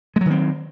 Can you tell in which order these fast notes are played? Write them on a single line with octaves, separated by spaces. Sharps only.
G#3 F#3 D#3 C4